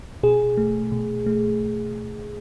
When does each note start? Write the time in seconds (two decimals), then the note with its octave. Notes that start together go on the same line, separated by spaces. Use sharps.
0.23 B2 G#4
0.57 A3
0.92 B2
1.26 A3